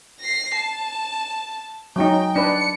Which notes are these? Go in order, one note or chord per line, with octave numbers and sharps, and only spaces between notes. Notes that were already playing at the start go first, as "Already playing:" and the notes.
A#6 C7
A5
F#3 C#4 D#4 G5
D4 B4 C#7